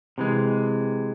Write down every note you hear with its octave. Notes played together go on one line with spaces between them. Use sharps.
C3 E3 G#3